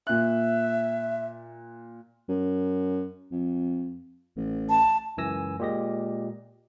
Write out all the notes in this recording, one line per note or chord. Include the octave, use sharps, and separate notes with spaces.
A#2 E5 F#6
F#2
F2
A1
A5
C#2 F#2 E3 G#5 E6 A#6
A#2 G#3 G4 D#5 A#6